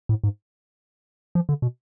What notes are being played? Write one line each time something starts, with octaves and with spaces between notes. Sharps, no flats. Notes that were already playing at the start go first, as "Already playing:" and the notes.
A2
G#2
F3
D3
B2